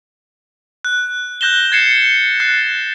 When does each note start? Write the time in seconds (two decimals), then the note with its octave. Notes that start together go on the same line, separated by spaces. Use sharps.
0.85 F#6
1.41 F#6 G6 A#6 E7 G7
1.72 G#6 A6 C7 C#7 E7
2.40 F#6 A6 C7